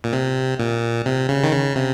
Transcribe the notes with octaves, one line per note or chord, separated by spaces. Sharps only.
A#2
C3
A#2
C3
C#3
D#3
C#3
C3